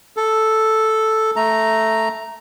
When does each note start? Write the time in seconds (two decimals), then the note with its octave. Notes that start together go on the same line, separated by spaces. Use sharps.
0.17 A4
1.36 A3 A#5